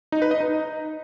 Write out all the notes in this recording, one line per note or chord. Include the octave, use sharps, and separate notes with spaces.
D#4
B4
D#5
D#4